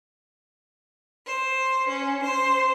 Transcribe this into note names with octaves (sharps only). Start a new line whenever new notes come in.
C5
C#4
C5